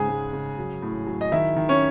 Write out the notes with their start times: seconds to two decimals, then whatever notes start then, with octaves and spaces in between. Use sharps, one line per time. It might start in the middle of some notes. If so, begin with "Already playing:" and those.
Already playing: G#2 C#3 G#4 G#5
0.08 G#3
0.33 C#3
0.58 F#3
0.82 A2
1.07 F#3
1.21 D#5
1.32 D#3 E4 E5
1.56 D#3
1.69 C#4 C#5